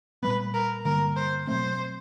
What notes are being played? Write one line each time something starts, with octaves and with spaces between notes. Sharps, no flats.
A#2 G3 B3 B4
A#4
G2 D3 G3 A#3 A#4
C5
B2 F#3 A3 C4 C5